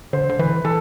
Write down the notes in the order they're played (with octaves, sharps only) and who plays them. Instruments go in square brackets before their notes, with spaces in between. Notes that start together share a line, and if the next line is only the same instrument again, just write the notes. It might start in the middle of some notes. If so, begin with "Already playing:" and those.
[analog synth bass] D3 [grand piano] C5
[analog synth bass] D3
[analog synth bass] E3 [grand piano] B4
[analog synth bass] E3 [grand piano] A4